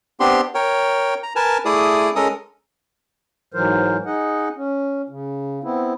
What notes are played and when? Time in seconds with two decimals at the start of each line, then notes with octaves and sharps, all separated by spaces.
0.20 B3 C4 D4 G4 C6
0.55 A#4 C#5 G5
1.23 A#5
1.36 A#4 B4 G#5 A5
1.65 A3 E4 G#4 D5 D#6
2.16 G#3 C#4 A4 A#4 D#6
3.54 G#2 E3 F#3 A#4 C5
4.06 D#4 G#4 D#5 F#5
4.56 C#4
5.09 C#3
5.64 B3 C4 E4